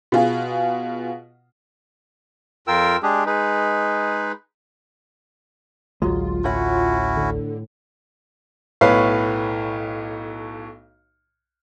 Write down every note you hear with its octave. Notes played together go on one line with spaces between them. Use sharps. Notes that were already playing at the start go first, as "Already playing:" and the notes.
B2 F4 G#4
F2 F4 A#4 G5 E6
G#3 D4 G4 G#4
G#3 D#4 G#4 B4
A1 D2 F#3 G#3 F4
A2 C#4 E4 F#4 F#5
D3
B1 A2 B4 C#5 F5